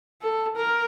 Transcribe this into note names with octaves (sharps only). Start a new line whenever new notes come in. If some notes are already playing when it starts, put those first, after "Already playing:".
A4
A#4